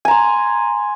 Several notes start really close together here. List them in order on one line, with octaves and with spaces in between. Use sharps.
G#5 A#5 C6